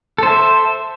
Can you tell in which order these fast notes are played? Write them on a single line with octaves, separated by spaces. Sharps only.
A4 C5 E5